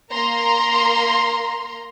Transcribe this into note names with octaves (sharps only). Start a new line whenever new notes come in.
A#3 A#5 C6